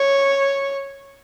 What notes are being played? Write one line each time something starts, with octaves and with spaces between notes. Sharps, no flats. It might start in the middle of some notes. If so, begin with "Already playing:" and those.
Already playing: C#5